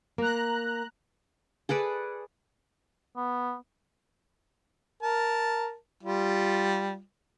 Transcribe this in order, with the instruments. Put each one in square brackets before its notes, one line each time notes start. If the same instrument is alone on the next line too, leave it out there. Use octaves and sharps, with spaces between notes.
[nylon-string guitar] A#3 [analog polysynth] A#5 F#6
[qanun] G#4 A4 B4 D5
[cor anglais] B3
[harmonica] A#4 A5
G3 F4